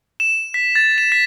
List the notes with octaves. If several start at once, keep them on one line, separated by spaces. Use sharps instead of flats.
E7
B6
A6
E7
B6